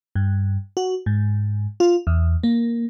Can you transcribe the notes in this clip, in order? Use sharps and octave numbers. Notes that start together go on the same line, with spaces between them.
G2
F#4
G#2
F4
E2
A#3